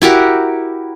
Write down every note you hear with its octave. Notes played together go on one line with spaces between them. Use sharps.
E4 F#4 G4 A#4